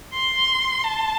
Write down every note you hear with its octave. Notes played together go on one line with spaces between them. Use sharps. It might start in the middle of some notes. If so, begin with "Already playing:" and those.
C6
A5